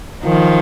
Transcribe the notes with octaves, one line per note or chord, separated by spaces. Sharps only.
D#3 F3